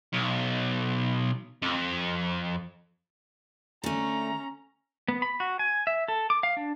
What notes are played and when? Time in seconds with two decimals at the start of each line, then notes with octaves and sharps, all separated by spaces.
0.13 B1
1.62 F2
3.84 D3 A3 C#4 A#5
5.08 B3
5.22 B5
5.40 F#4
5.59 G#5
5.87 E5
6.08 A4
6.30 D6
6.43 F5
6.57 D4